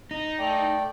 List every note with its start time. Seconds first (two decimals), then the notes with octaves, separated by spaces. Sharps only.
0.11 D#4
0.39 A3 D5 G5